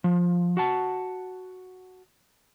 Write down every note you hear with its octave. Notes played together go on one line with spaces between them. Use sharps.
F3
F#4 F#5 A5